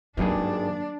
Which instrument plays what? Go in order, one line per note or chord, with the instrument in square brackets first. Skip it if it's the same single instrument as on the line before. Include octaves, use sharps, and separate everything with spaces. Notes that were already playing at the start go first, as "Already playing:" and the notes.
[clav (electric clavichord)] G#1 G2 G#4 [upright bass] F#3 A#3 [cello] D4